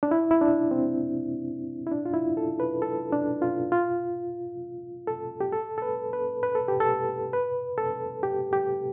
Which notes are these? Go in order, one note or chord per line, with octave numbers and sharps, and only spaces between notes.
D4
E4
E4
D4
C4
E4
D4
F4
E4
A4
B4
A4
D4
F4
F4
A4
G4
A4
A4
B4
B4
B4
A4
G4
A4
B4
A4
G4
G4